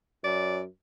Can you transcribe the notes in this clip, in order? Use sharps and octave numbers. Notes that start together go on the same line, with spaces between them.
F#2 D5